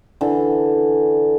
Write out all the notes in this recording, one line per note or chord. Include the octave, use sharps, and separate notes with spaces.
D3 E3